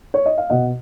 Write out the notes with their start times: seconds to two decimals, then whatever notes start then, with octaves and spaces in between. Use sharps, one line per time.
0.14 C#5
0.26 D#5
0.38 F5
0.50 B2 D#5 F#5